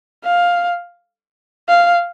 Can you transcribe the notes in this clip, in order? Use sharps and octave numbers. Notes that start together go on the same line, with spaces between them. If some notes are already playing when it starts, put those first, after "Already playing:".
F5
F5